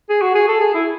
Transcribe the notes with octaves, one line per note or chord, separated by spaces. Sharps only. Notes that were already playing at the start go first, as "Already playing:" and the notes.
G#4
F#4
G#4
A4
G#4
E4